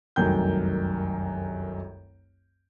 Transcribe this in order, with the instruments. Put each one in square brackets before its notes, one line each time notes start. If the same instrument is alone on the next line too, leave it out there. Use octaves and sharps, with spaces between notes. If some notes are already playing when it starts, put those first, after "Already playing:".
[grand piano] F1 C2 F#2 D#3 G5 G6